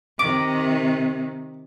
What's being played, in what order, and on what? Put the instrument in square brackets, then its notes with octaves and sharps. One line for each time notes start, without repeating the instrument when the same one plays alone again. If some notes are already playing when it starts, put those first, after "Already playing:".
[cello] C3 D#3 [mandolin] D6